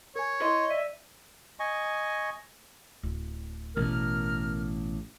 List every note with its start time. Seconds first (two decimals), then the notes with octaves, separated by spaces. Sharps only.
0.16 A#4 C#5 G#5
0.42 E4 D#5 C6
0.68 D5 E5 D#7
1.60 D#5 G#5 C#6
3.03 D1
3.76 A1 B2 A#4 F6